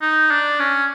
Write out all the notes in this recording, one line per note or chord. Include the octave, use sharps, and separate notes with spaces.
D#4
D4
C#4